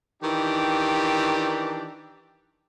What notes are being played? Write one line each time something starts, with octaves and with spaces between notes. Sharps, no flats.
D#3 E3 D4 G4